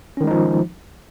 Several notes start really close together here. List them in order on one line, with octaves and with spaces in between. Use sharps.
C#4 D#3 G#3 D#4 F3